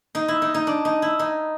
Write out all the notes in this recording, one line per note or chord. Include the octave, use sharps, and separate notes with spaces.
D#4
E4
D#4
D#4
D4
D#4
E4
D#4